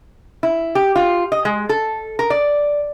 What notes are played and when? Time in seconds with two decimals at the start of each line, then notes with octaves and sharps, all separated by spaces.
0.43 E4
0.75 G4
0.96 F4
1.32 D#5
1.45 G#3
1.69 A4
2.19 A#4
2.30 D5